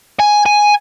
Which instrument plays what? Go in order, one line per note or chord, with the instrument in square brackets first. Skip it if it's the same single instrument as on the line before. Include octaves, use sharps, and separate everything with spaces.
[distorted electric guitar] G#5
G#5